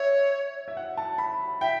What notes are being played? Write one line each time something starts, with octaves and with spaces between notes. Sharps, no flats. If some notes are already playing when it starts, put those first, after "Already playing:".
Already playing: C#5 E5
E5
F#5
A5
B5
E5 G5